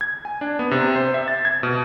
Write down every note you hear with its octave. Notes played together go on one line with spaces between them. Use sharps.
G#6
G#5
D4
B3
C3
C5
E5
A6
G#6
B2